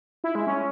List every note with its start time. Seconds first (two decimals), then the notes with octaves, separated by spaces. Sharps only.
0.24 E4
0.35 G#3
0.47 C#4